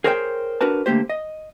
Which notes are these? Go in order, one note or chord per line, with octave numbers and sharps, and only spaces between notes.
G#4 A#4 C5 C#5 E5 G5
D4 F#4 A#4 B4 A5
D3 A3 A#3 G4 C5
D#5